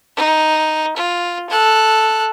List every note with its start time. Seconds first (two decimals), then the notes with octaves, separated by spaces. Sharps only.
0.16 D#4
0.96 F4
1.49 A4 F#6